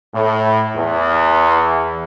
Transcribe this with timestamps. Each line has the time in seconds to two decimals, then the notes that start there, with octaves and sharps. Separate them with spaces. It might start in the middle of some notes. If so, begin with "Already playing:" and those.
0.14 A2
0.75 E2